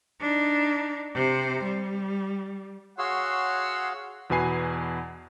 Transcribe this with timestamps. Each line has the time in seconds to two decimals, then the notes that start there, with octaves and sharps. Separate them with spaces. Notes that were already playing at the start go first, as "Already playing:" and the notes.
0.20 D4 D#4
1.14 C3 C5
1.63 G3
2.98 F#4 G#4 C#5 F5 F#5 C6 E6
4.30 E2 B2 B4 G#5 C7